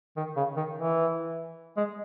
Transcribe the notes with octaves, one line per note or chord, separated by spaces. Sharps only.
D#3
C#3
D#3
E3
G#3